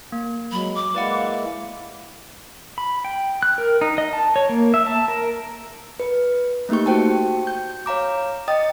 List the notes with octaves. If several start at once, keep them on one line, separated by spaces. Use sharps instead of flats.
A#3
F#3 G#3 B5
D6
G#3 A#3 E4 B4 D5 F5 F#5
B5
G5
F#6
A#4
D#4
D#5
A5
C#5
A#3
E5
A5
A#4
B4
A3 A#3 D#4 G4 C#6
F#4 C5 G5 A5
G6
C#5 F5 A#5 D6
D#5 G5 D#6 A6